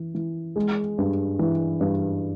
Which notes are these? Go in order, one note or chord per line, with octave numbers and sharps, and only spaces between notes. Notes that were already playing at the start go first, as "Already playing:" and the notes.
Already playing: E3
E3
G#3
G2
E3
G2